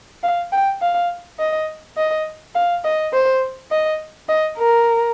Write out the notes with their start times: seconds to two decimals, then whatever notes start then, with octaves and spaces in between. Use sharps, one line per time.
0.23 F5
0.52 G5
0.81 F5
1.39 D#5
1.97 D#5
2.55 F5
2.84 D#5
3.13 C5
3.71 D#5
4.29 D#5
4.58 A#4